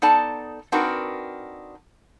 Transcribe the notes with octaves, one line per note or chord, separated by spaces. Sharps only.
B3 D#4 A4 D5 A5
C4 D4 D#4 F#4 A#4 B4